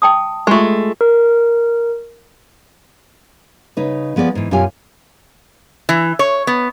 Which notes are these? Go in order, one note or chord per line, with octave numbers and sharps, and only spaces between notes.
G5 A5 D#6
G#3 A3 F4 G4
A#4
C#3 D#4 B4
F3 B3 G#4 A4 D5
G#2 E3
F#2 B2 F4 G4 F5 G#5
E3
C#5
B3